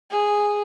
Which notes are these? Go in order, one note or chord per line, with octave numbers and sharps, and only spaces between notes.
G#4